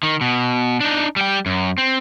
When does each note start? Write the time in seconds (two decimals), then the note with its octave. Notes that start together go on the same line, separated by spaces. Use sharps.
0.03 D#3
0.21 B2
0.81 D4 D#4
1.16 G3 G5
1.46 F#2
1.78 C4